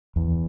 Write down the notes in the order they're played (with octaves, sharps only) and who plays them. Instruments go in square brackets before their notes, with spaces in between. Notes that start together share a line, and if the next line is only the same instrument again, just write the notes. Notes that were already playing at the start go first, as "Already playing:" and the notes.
[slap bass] E2